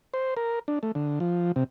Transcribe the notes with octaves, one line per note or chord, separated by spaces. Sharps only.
C5
A#4
D4
A3
D3
F3
C3